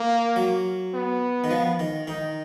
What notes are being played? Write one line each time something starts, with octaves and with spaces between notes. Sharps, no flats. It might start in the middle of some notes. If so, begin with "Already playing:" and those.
Already playing: A#3
F#3
B3
D#3
F3
D#3
D#3 D#4